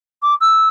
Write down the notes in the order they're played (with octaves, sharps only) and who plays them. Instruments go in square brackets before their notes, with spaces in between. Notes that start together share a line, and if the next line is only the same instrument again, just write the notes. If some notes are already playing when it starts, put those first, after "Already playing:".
[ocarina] D6
E6